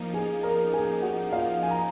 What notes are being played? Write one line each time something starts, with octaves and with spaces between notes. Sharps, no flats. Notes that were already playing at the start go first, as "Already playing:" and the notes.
Already playing: F3 A#3 D#4
G#4 G#5
A#4 A#5
G#4 G#5
F#4 F#5
F4 F5
G#5
A#5